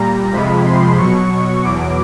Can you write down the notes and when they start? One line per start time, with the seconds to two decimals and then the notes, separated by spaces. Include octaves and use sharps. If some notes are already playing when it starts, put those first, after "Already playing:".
Already playing: A#2 G3 A#5
0.32 F2 C3 F3 G#3 B5
0.65 C6
0.98 B2 F#3 C#6
1.63 E2 B2 F#3 D6